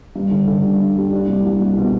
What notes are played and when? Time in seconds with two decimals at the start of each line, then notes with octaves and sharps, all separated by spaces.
0.16 G2
0.31 D3
0.47 D3
0.63 G2
0.80 G2
0.96 G3
1.12 D4
1.28 C2
1.44 C2
1.61 C2
1.77 B2